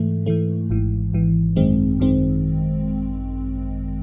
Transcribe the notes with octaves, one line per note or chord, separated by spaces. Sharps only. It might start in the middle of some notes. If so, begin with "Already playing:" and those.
Already playing: G#2 E3 A3
G#2 E3 A3
G#1 G#2 E3
G#1 G#2 E3
G#1 F#2 D#3 G#3 C4
G#1 F#2 D#3 G#3 C4